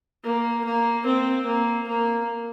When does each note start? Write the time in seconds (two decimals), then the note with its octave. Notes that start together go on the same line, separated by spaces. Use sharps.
0.24 A#3
0.65 A#3
1.06 C4
1.46 A#3
1.88 A#3